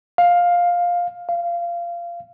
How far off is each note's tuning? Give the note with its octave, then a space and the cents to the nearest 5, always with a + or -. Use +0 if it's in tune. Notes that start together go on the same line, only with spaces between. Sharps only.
F5 +10
F5 -20